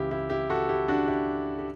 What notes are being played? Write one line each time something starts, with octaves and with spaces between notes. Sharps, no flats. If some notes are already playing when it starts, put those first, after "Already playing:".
Already playing: C#2 C#3 E3 E4 G4
E4 G4
E4 G4
F#4 A4
E4 G4
D4 F#4
E4 G4
G4